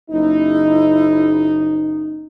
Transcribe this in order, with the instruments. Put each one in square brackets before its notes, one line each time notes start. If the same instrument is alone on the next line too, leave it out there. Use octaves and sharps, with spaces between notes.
[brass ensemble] F#1 D#4 [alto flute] E4